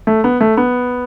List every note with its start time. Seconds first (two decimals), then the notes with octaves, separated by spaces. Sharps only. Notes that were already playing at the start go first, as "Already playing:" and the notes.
0.07 A3
0.24 B3
0.41 A3
0.57 B3